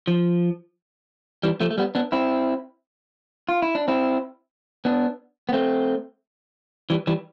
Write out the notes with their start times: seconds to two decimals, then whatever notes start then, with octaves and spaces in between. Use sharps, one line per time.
0.07 F3
1.43 E3 G3
1.61 F3 A3
1.71 A3
1.78 G3 B3
1.95 B3 D4
2.12 C4 E4
3.49 F4
3.62 E4
3.75 D4
3.88 C4 E4
4.85 B3 D4
5.49 B3
5.53 A3 C4
6.90 E3 G3
7.07 E3 G3